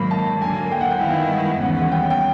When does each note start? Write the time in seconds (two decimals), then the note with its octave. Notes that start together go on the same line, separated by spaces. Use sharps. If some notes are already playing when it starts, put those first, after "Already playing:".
Already playing: G#2 D#3 F#3 A#3 B5
0.11 A5
0.41 D3 F#3 A#3 G#5
0.71 G5
0.81 F#5
0.91 G5
1.01 G2 D#3 G#3 B3 E4 F5
1.31 F#5
1.61 D#2 C#3 E3 G3 B3 F#5
1.81 F#5
1.92 G5
2.10 G5